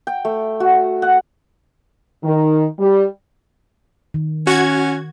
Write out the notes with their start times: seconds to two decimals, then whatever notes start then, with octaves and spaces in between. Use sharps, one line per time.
0.07 G5
0.25 A3
0.60 F#4
1.02 F#5
2.23 D#3
2.79 G3
4.14 D#3
4.47 C#4 F#4 G#6